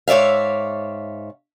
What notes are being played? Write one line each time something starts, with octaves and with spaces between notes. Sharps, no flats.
G#2 C#5 D5 E5 F5